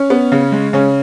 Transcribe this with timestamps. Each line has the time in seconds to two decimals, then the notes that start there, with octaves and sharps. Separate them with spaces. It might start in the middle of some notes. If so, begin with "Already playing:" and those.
Already playing: C#4
0.10 B3
0.32 C#3
0.52 G#3
0.73 C#3 C#4